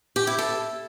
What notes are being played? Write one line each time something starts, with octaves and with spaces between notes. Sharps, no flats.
G4
E4
A4